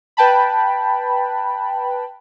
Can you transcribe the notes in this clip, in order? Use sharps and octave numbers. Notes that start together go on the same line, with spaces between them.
B4 G5 A5 B5